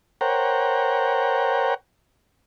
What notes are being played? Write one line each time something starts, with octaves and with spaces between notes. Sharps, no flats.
A#4 C5 C#5 F#5 G5 A#5